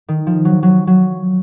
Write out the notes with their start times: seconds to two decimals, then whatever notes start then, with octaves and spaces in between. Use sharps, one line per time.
0.08 D#3
0.27 F3
0.45 F#3
0.63 F#3
0.87 F#3